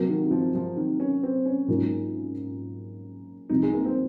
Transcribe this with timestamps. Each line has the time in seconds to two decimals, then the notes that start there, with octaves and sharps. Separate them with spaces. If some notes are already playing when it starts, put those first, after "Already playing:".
Already playing: C3 F#3 A#3
0.09 D#3
0.26 D#3
0.31 F3
0.55 F3
0.77 D#3
1.00 C#4
1.23 C4
1.45 C#4
1.68 G#2 F#3 A#3 C#4 D#4 F4
3.49 C2 C3 F3 D#4
3.63 G#3
3.73 A#3
3.85 C4